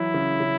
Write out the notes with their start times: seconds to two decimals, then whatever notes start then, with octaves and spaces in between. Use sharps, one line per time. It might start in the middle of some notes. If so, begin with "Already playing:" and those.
Already playing: E3 F#3 E4
0.14 C#3
0.40 C#3